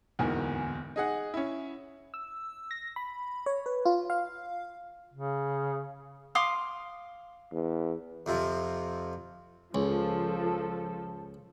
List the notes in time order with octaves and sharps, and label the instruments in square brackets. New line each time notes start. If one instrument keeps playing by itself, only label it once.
[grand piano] D1 E2 G#2 A#3 A#4 G#5
D#4 G#4 F#5
C#4 E4
[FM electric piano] E6
A#6
B5
C#5
B4
F4
F5
[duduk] C#3
[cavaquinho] F5 C6 D6 D#6
[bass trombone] E2
[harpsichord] F2 C3 F3
[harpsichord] C#2 [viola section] F3 A4